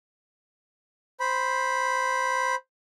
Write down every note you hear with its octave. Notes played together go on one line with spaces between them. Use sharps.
C5 B5